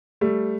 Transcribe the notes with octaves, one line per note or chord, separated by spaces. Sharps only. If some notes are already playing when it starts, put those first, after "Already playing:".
G3 A3